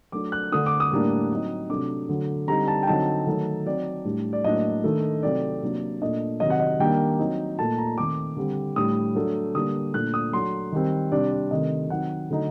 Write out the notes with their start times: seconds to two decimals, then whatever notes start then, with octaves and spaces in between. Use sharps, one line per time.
0.12 F#3 A3 D4 D6
0.32 F#6
0.52 D3 A3 D4 D#6
0.66 D6
0.80 D#6
0.92 A2 G3 A#3 D4
1.31 F#3 C4 D#4
1.70 C3 F#3 A3 D4 D6
2.09 D3 F#3 A3
2.48 D3 G3 C4 D#4 A#5
2.68 A5
2.83 G5
2.87 D3 F#3 C4 D#4 A5
3.27 D#3 F#3 A3 D#4
3.66 F#3 C4 D#4 D5
4.05 A2 G3 D4
4.33 D5
4.44 A2 F#3 A#3 D4 D#5
4.84 D#3 A3 D4
5.23 C3 F#3 A3 C4 D#4 D5
5.63 C3 F#3 A#3 D4
6.02 A#2 A3 D4 D#5
6.40 C3 D#3 F#3 D#5
6.50 F#5
6.60 D#5
6.79 D#3 G3 A#3 D4 G5
7.19 F#3 C4 D#4
7.58 A#2 A3 D#4 A5
7.78 A#5
7.97 D#3 A3 C4 D6
8.37 D3 G3 C4
8.76 A2 G3 D4 D#6
9.15 F#3 A3 D4
9.55 D3 G3 A#3 D4 D#6
9.94 A#2 A3 D4 F#6
10.14 D#6
10.33 F#3 A3 D4 C6
10.72 D#3 G3 C4
11.12 C3 G3 D4 D5
11.31 D5
11.51 C3 D#3 A3 D#5
11.90 D#3 F#3 C4 D#4 F#5
12.30 D3 F#3 A3 D#4